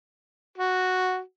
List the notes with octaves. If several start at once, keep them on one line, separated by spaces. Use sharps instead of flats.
F#4